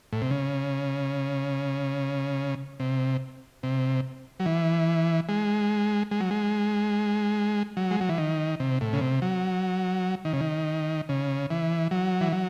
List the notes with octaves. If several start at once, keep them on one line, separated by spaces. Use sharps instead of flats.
A2
C3
C#3
C3
C3
F#3
E3
G#3
G#3
F#3
G#3
F#3
G#3
F#3
E3
D#3
C3
A2
C#3
C3
F#3
D#3
C#3
D#3
C#3
E3
F#3
E3
F#3